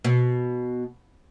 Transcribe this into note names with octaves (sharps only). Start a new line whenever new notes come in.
B2